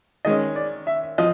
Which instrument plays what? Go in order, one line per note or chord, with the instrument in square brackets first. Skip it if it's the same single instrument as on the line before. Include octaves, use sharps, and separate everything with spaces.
[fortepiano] D#3 G#3 C#4 [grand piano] D#5
[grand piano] D5
E5
[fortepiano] F3 [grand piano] D#5